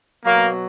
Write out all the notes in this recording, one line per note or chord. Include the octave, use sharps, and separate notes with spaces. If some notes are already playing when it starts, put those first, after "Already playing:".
B2 F#3 A#3